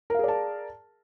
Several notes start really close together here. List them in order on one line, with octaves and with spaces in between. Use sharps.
A#4 F5 G#4 D5 A5